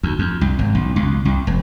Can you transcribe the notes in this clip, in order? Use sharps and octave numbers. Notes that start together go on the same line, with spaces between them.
D2
F2
C2
G#1
B1
C#2
C2
F1